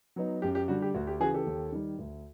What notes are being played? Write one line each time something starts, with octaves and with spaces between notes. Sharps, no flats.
F#3 B3 D#4
F#2 G4
G4
D3 G3 F#4
G4
D2 F#4
G4
C#3 E3 F#4 G#4
G4 A4
D#2
D#3 G3
D2